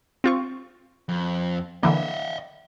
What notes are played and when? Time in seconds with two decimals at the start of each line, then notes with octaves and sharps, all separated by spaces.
0.24 C4 F4 C#6
1.09 F2
1.83 D3 E3 A#3 D#5 E5